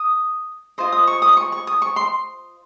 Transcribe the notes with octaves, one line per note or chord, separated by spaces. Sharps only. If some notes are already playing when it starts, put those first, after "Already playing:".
Already playing: D#6
F4 C5 D#5
D#6
C#6
D#6
C#6
C#6
D#6
C#6
C6